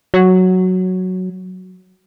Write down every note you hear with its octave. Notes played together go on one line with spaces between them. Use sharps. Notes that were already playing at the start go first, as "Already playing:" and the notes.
F#3